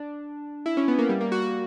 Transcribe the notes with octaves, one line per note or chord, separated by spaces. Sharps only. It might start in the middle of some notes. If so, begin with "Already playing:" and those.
Already playing: D4
E4
C#4
B3
A#3
G3
A#3
F#4
F#4